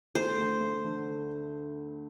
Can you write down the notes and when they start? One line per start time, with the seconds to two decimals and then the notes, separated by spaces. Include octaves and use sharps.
0.15 A3 C5
0.38 D2
0.60 D2
0.84 D3